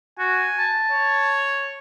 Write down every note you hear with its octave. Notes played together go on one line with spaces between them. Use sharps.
F#4 G#5
A5
C#5